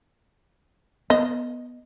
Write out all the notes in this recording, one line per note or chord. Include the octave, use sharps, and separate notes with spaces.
B3 D#5